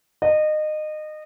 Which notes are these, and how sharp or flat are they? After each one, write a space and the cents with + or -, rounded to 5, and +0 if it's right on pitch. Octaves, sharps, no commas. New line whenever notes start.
D#5 -25